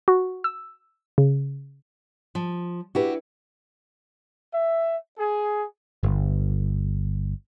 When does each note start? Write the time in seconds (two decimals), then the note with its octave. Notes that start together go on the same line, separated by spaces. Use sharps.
0.08 F#4
0.44 E6
1.18 C#3
2.35 F3
2.95 D4 E4 F#4 G4 B4
4.54 E5
5.18 G#4
6.03 G1